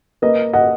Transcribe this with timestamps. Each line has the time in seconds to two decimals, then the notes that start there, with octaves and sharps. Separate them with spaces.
0.22 A#3 B4 D#5
0.53 D#5 F#5